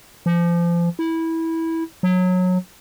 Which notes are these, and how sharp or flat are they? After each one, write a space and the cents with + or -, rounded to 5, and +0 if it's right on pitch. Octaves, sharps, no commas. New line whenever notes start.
F3 -30
E4 -15
F#3 -20